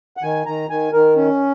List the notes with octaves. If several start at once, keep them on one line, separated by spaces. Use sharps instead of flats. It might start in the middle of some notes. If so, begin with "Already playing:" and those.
F#5
D#3 G#5
D#3 A#5
D#3 G#5
D#3 A#4
C#4